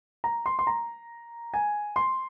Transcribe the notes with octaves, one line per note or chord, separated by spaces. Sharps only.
A#5
C6
C6
A#5
G#5
C6